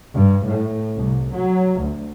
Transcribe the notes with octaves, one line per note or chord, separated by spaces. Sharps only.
G2
A2
C2
F#3
D2